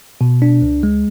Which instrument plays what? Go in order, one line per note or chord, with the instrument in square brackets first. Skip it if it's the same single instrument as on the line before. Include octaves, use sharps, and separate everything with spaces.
[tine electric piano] B2
D4
C#2
G#3